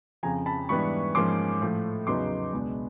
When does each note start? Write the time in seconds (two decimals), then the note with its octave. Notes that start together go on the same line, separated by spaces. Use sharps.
0.23 F2 C#3 F3 G#5 A#5
0.46 A5 B5
0.69 G#2 E3 G3 B3 D4 B5 C#6
1.15 G#2 F3 A#3 C#4 C6 D6
1.62 A2 F3 A3
2.07 E2 C#3 F#3 B3 D#4 C6 D6
2.53 C#2 B2 G#3 B3 D4